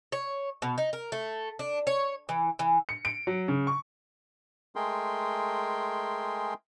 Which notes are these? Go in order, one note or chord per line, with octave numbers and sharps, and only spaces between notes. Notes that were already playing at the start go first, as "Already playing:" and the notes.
C#5
B2
D#4
A#4
A3
D4
C#5
E3
E3
C#7
D7
F#3
C#3
C#6
G#3 A3 G#4 A#4 G5 C6